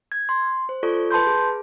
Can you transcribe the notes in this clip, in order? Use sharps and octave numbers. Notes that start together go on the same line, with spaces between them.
G#6
C6
C5
F4 A4 D5 C#6
B4 A5 B5 C6 G6
G#4